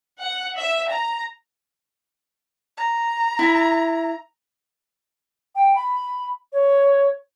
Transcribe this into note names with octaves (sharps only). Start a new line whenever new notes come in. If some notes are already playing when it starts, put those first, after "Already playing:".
F#5
E5
A#5
A#5
E4 E5
G5
B5
C#5